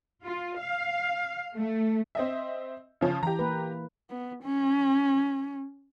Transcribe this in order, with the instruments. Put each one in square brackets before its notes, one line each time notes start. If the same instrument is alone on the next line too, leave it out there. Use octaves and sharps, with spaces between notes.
[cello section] F4
F5
A3
[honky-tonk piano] C4 D#5 E5
C#3 F3 C#4
[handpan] E3 [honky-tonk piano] G4 A#5
[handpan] A#3 B4
[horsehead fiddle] B3
C#4